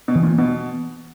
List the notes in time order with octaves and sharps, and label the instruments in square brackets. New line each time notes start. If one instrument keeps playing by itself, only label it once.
[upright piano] B2
[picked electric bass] E3
[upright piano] A#2
[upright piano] B2 [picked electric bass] B3